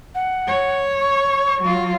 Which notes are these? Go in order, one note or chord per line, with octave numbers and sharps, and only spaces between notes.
F#5
C#5
C#6
F#3 F4